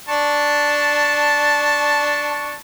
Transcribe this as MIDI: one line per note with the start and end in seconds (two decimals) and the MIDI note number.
0.09 2.55 62
0.09 2.55 81
0.09 2.55 85